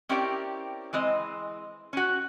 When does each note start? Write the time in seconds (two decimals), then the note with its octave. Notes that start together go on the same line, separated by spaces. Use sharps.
0.09 C4 C#4 E4 G4 A#4 D5
0.93 E3 G#3 C4 D#5
1.93 C#4 F#4